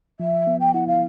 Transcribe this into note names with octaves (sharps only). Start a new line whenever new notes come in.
F3 E5
B3
G5
E4 F#5
F5